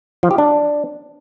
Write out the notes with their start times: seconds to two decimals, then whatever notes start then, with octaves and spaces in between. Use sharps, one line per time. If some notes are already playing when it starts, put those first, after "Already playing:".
0.23 F3
0.31 G4
0.38 D4